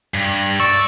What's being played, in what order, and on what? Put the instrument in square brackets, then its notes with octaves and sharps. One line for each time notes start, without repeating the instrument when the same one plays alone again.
[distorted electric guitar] G2
[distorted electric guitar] D5 [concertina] C#6 E6